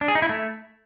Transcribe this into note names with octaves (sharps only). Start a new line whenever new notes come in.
D4
G#4
D#4
E4
A3